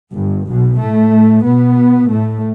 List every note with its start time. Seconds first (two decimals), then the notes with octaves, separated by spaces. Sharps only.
0.15 G1 G2
0.47 B1 B2
0.79 A2 A3
1.44 B2 B3
2.10 A2 A3